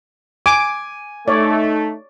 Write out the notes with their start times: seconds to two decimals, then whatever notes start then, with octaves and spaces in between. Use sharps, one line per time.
0.46 G#5 D6
1.28 A3 D#4 C#5 D5